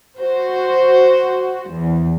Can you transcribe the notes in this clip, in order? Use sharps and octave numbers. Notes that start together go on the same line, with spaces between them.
F#4 C5
E2